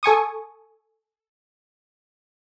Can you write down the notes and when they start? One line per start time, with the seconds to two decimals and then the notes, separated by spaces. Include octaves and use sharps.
0.03 A4 G#5 C#6 D#6